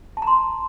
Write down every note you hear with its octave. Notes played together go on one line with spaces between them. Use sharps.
A5
A#5
C6